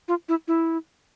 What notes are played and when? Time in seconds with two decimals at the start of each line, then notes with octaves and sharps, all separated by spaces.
0.08 F4
0.29 E4
0.48 E4